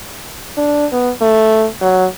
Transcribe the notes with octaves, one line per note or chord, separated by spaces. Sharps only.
D4
B3
A3
F#3